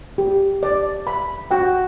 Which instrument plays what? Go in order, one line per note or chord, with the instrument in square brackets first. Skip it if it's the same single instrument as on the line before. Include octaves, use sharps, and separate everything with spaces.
[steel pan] G4
D5
B5
[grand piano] F#4 [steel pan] G5